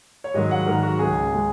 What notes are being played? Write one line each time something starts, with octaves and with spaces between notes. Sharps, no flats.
C#5
G#2 D#3 F#3 D#5
F#5
G#2 D#3 F#3 A#4
F#4
C#2 C#3 G#3 G#4
C#3 G#3